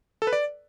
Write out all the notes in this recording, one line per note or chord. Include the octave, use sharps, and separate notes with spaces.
A4
B4
D5